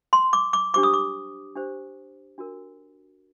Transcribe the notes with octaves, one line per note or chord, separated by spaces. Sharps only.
C6
D6
D6
D4 G4 C5 D6
D#6
D6
D4 G4 C5
D4 F#4 A#4